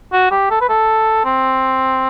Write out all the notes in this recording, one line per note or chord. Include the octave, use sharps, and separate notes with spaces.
F#4
G4
A4
B4
A4
C4